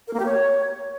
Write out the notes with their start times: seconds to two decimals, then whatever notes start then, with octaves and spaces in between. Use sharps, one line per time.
0.08 A#4
0.14 A#3
0.20 G4
0.26 C#5